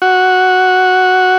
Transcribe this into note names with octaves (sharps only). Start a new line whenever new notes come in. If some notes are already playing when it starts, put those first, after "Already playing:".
F#4